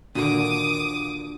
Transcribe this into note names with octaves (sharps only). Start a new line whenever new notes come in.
A#2 D3 D#3 D4 F4 F#4 D6 D#6